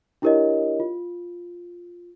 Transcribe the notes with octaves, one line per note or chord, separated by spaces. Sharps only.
D4 E4 G4 A#4 C#5 D#5
F4